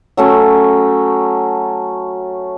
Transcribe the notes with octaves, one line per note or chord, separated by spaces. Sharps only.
F#3 A3 C#4